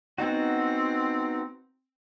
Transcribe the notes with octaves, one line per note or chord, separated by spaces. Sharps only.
B3 C4 D#4 F#4